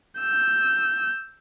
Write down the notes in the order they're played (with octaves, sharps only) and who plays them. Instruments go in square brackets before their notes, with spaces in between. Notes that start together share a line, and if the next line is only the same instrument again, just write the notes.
[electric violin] E6 G6